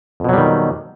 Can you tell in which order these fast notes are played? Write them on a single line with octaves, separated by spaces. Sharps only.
F2 B2 F#3 G3 D#3